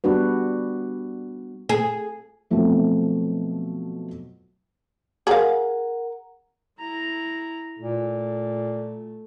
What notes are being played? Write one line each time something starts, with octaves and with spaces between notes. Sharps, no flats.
G3 B3 D4 F#4 B4
G#4
B2 F3 F#3 A3 C4
G#4 A#4 F5 F#5 A#5
E4 A#5
A#2 A3